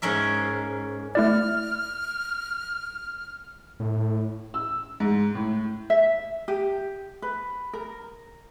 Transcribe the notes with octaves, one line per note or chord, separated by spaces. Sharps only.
G#2 C#4 A#4 E5
A3 E4 D5 F6
A2
E6
G#2
A2
E5
G4
B4
A#4